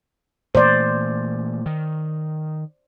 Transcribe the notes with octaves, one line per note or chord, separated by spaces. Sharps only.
A#2 E3 A3 C5 D5
D#3